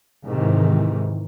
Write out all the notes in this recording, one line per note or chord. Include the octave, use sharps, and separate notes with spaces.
G#2 C3 D#3 E3